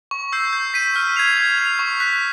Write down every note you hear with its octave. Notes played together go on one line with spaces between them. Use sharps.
C#6
E6 G6 C7
G6
B6 D#7
F6
G#6 C7 F7
G#6
C7 F7
C#6
F#6 B6